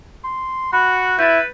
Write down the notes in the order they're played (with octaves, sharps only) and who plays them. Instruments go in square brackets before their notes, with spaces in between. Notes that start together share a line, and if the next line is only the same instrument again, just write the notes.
[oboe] C6
[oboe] F#4 [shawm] F#5 [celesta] B5
[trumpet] E4 [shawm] B4 [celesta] G6 A6